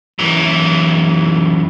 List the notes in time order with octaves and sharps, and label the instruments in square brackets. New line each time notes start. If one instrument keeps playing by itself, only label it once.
[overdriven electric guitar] F#2 E3